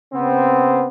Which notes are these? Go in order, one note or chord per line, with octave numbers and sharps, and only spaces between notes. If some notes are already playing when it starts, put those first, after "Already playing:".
C#3 B3 C4